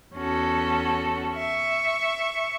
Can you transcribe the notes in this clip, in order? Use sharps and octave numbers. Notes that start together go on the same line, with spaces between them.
E2 C#4 F#4 A4
E5 C#6